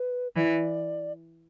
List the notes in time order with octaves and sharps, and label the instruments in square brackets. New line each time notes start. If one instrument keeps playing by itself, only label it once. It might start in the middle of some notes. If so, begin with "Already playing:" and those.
Already playing: [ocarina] B4
[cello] E3 [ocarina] D5